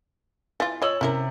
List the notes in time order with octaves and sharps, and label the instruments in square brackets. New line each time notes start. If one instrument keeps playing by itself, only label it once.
[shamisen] E3 F4 [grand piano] A6
[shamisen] F4 D#5 [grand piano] C#5 E6 F#7
[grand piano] C3 [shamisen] C#4 E4 A#4